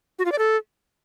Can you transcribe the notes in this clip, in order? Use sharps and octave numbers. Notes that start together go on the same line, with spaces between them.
F#4
F4
D5
A4